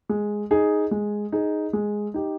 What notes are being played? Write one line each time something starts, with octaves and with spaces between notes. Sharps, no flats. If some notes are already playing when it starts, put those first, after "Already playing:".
G#3
D#4 G#4
G#3
D#4 G#4
G#3
D#4 G4